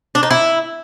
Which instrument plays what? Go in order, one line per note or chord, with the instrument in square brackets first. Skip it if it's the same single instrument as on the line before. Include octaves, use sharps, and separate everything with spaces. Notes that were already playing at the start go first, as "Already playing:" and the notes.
[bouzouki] D4
D#4
E4